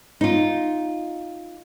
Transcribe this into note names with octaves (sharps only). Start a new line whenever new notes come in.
D#4 F4